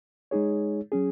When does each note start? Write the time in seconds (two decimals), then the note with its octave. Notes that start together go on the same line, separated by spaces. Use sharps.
0.31 G#3 D#4 G#4 C#5
0.92 F#3 C#4 G#4